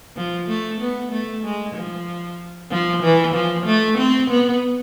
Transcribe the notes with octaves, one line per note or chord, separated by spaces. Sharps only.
F3
A3
B3
A3
G#3
F3
F3
E3
F3
A3
C4
B3